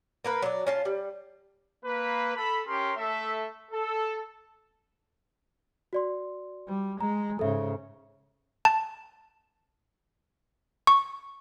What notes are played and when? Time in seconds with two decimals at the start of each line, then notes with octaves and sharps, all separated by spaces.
0.25 A#3 A#4 B4
0.42 F#3 D4
0.67 C#4 F4 A5
0.85 G3
1.84 A#3 B4
2.36 A4 B5
2.66 C#4 G4 A#4 C6
2.97 A3 A4 E5
3.72 A4
5.93 F#4 D5 C6
6.68 G3
7.01 G#3 A#5
7.39 G#2 C#3 A4 E5
8.65 A5
10.87 C#6